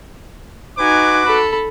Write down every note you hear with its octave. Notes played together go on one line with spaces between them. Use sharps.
D#4 F#4 B4 G#5 D6
A4 B5